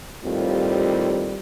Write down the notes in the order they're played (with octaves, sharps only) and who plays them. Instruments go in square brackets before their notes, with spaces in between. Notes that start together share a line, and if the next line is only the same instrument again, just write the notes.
[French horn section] D#2 A2 G3 C4 F4